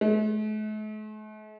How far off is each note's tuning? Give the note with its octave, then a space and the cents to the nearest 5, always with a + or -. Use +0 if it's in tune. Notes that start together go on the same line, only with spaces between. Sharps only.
A3 -45